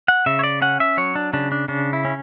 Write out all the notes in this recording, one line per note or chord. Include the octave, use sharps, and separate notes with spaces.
F#5
C#3 E5
C#5
D5
C#4 F#5
E5
F#3 C#5
D4
C#3 D4
D4
C#3 D4
E4
C#4